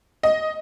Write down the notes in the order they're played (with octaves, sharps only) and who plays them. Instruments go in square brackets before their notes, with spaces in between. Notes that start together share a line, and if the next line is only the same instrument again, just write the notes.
[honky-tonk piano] D#5